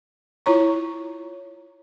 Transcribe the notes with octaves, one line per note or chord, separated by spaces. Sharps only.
E4 F4 C#5 A#5 C#6